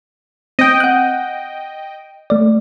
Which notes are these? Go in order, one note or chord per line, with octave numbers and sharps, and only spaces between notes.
C4 D#5 G5
F#5 F#6
A3 D5